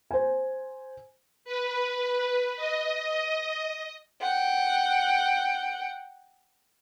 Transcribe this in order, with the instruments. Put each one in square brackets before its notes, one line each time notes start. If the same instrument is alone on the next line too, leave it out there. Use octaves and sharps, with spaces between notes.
[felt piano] C5 G#5
[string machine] B4
D#5
[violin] F#5 G5